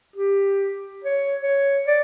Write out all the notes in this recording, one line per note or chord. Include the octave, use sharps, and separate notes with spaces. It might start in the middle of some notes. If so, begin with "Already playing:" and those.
G4
C#5
C#5
D5